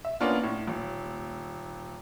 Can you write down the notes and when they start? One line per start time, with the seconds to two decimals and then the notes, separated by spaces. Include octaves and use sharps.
0.05 E5
0.20 A#3 B3 C#4 D4 F4
0.43 A2
0.67 D#1